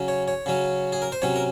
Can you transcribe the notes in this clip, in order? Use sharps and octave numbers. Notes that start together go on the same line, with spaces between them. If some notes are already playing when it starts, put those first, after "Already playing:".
Already playing: C#3 F#3 C#4
C#5
C#5
C#3 F#3 C#4
G#4
A#4
C5
C3 F#3 C#4 C#5
A#4